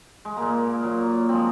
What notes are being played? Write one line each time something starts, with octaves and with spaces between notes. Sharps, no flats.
G#3
A#2 G#3 A#3
A#2 F#3
F3 G#3 C4